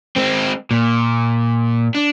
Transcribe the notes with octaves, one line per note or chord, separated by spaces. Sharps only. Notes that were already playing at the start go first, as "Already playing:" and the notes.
G#3 C4
A#2
D4